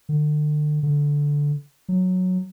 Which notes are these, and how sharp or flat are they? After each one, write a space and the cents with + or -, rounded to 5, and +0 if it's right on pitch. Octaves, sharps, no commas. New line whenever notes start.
D3 +35
D3 -10
F#3 -10